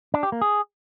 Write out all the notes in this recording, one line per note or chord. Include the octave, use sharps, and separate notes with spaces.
D4
G4
A#3
G#4